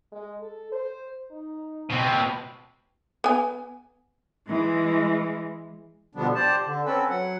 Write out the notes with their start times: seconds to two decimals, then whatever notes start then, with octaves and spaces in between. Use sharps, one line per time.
0.12 G#3
0.41 A4
0.72 C5
1.31 D#4
1.90 B2 C4
3.24 B3 G#5
4.47 E3 G#3
6.15 B2 D3 F3 G3 B3 D4
6.35 G4 C5 D5 A5
6.66 D3
6.85 C4 C#4 A4 B4
7.10 F#3 F#5